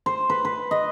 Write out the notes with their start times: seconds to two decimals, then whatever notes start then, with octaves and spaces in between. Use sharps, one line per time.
0.06 C5
0.30 B4
0.45 B4
0.71 D#5